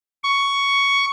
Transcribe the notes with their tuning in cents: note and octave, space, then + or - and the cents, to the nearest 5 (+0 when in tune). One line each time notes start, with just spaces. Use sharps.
C#6 +10